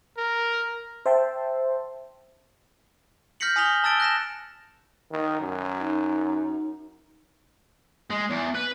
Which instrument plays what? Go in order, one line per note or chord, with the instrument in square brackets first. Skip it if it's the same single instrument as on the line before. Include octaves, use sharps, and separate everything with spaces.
[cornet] A#4
[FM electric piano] C5 E5 G5 A5 C6
[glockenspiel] F6 G6 A#6 B6 C#7 F#7
G#5 D#6 A#6 B6 F7 G7
A5 E6 A6 D7 G7
F#6 A#6 E7
[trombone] D#3
F#2
[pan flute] D#4
[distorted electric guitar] G#3
E2
B4